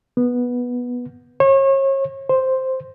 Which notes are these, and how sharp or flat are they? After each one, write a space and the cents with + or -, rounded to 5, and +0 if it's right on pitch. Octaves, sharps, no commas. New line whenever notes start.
B3 -10
C#5 -35
C5 +0